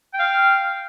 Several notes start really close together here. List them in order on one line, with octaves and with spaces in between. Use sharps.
G5 F5 F6